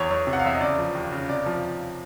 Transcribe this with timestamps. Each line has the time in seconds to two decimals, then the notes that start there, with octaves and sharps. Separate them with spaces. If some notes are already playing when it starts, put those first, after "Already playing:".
Already playing: E2 C#5
0.11 E2
0.27 C3
0.33 F#5
0.39 F5
0.44 E2 E5
0.54 D#5
0.61 C#3 D5
0.79 F3
0.95 D#2
1.12 C#3
1.29 C3 D5
1.46 F3